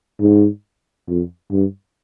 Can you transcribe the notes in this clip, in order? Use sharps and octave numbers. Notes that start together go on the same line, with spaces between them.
G#2
F2
G2